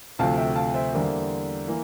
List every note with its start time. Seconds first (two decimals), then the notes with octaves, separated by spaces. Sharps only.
0.19 D2 C3 F3 A3 F5 A5
0.37 E5 G5
0.56 F5 A5
0.74 C5 E5
0.94 E2 D3 G3 A#3
1.68 E3 A#3